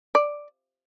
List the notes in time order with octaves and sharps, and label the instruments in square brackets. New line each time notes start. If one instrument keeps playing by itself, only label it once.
[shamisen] D5